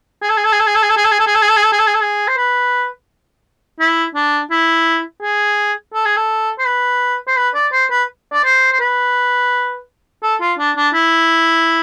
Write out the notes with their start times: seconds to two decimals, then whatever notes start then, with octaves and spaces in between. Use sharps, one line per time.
0.22 G#4
0.29 A4
0.37 G#4
0.44 A4
0.52 G#4
0.59 A4
0.66 G#4
0.75 A4
0.82 G#4
0.89 A4
0.97 G#4
1.04 A4
1.11 G#4
1.20 A4
1.27 G#4
1.34 A4
1.42 G#4
1.49 A4
1.56 G#4
1.64 A4
1.72 G#4
1.79 A4
1.87 G#4
1.94 A4
2.01 G#4
2.28 C5
2.37 B4
3.80 E4
4.15 D4
4.51 E4
5.22 G#4
5.94 A4
6.05 G#4
6.16 A4
6.59 C5
6.65 B4
7.27 C5
7.37 B4
7.55 D5
7.72 C5
7.91 B4
8.33 D5
8.44 C5
8.72 C5
8.80 B4
10.23 A4
10.41 F4
10.58 D4
10.76 D4
10.94 E4